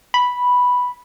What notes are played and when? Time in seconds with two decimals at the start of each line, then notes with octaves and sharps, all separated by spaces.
0.14 B5